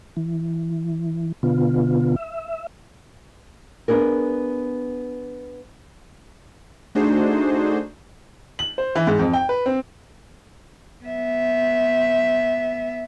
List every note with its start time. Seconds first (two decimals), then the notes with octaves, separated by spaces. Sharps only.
0.17 E3
1.43 B2 D3 B3 F4
2.16 E5
3.88 B3 D4 G#4 A#4
6.95 A3 D4 D#4 F#4 G#4 C5
8.59 F#7
8.78 C5
8.95 E3
9.07 G#2
9.19 F2
9.33 G5
9.49 B4
9.66 C4
11.05 B3 E5